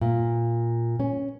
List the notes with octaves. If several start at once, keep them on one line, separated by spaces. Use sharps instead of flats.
A#2
C#4